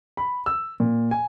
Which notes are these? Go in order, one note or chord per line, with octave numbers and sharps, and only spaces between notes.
B5
E6
A#2
G#5